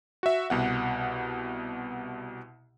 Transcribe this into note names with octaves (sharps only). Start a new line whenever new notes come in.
F#4 E5
C2 B2 F#5